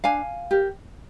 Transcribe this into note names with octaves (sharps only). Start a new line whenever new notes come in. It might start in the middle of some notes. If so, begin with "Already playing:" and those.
D4 F5 G#5
G4 A#4